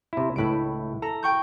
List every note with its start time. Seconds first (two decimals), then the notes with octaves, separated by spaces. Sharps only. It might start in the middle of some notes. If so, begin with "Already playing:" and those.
0.13 C3 E4
0.36 C#2 A2 E4 B4 D7
1.02 A4 A#5
1.23 G5 C#6 G6